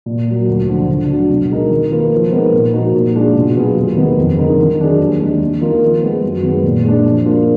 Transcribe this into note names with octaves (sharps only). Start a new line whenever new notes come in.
A#2
F#3 A#3
D2
D3 F3
D3
F#3 D4
B2
G#3 D#4 A#4
D#3
A#3 F4 B4
F3
G#3 B3 D#4 A#4
A#2
F3 A#3 D#4 F#4
A#2
G#3 D4 F4 G#4
B2
F#3 B3 F4 G#4
D#2
D#3 G#3 B3
F2
D3 G#3 D#4 A#4
D#3
F#3 D4 G#4
D#2
D#3 G#3 D4
D#2
D#3 A#3 F4
F3
G#3 B3
F#2
D#3 G#3 B3
A#2
G#3 D4
F3
A#3 D4 F4